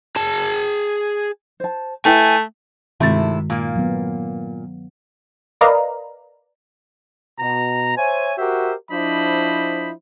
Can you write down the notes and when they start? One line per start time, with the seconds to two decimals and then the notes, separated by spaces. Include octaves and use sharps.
0.16 G#4 A5
1.60 C5 A5
2.05 A3 E4 B4 G5 G#5
3.00 G2 C3 D#3 G#3 A3 E4 A6
3.50 A#2 A#3 F5
3.76 F#3 B3
5.61 A#4 B4 D5 D#5 F5 A#5
7.39 B2 A#5
7.97 C5 C#5 E5 G#5
8.38 F#4 G4 A#4 C5 E5
8.91 F3 D4 E4 C5 D#5 B5